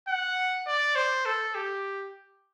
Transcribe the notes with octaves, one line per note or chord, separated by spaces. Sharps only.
F#5
D5
C5
A4
G4